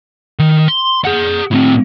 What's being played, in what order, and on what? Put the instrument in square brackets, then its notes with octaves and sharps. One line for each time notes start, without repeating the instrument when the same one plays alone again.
[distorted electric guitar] D#3
C6
G#4 F#5
A2 C4